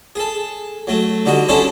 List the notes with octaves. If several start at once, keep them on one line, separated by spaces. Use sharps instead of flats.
G#4 A4
F#3 A3
D3 G3 D#4 F#4
C#4 D4 E4 G#4 A4 C5